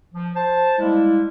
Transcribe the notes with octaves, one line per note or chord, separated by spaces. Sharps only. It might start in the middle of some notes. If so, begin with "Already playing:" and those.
F3
C5 A5
G3 G#3 A#3 E4